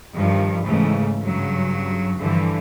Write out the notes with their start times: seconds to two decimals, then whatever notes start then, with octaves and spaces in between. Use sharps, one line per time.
0.14 G2 D#3 F3
0.63 G#2 C#3 E3 A3
1.22 G2 C#3 F#3
2.18 G2 D3 E3 F3